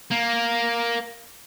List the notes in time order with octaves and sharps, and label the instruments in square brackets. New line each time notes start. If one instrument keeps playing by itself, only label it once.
[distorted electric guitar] A#3